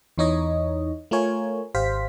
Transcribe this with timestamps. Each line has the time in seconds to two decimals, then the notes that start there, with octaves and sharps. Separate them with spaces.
0.18 E2 E3 D#4 C#5 D#5
1.11 A3 F4 A#4 C#5 G#5
1.75 G#1 G4 C5 F5 B6